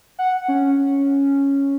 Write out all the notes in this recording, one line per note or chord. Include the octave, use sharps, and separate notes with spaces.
F#5
C#4